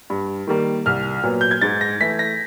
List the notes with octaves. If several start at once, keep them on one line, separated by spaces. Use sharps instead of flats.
G2
D#3 G3 A#3
C2 F6
A#2 F#3 B3
G6
G#6
G#2 A6
A#6
E3 A3 B6
A#6